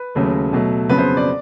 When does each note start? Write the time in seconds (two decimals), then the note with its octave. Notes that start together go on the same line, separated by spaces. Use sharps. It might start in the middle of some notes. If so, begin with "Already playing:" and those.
Already playing: B4
0.15 D#2 C#3 F#3 A3
0.52 B2 F#3 A3
0.89 F2 C#3 F#3 B3 B4
0.98 C5
1.17 D5